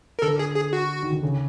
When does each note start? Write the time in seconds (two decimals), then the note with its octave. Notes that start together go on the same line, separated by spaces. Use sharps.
0.19 A#4
0.22 D3 A4
0.39 G#4
0.56 G#4
0.73 F#4
1.03 D#3
1.12 D3
1.23 C#3